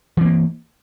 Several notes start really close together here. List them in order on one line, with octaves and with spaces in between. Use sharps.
E3 C4 A#3